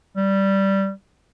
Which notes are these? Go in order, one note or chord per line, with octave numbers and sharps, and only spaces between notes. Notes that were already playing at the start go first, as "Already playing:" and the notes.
G3